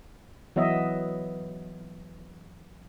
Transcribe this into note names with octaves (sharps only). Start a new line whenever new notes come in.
E3 F#3 B3 D#5 E5